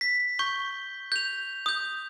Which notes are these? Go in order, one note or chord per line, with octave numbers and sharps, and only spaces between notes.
B6
C#6 G6 G7
G6 F7
D#6 G6